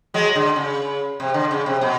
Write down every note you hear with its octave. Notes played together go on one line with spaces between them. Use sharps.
F#3 G#3
D3
C#3
C3
D3
C#3
C3
B2